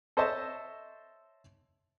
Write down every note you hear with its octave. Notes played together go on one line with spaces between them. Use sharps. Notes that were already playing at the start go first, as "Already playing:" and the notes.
A4 C5 C#5 D#5 E5 A5